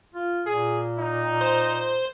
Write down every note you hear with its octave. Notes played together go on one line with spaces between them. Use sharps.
F4
A#2 G#4
D#4
C5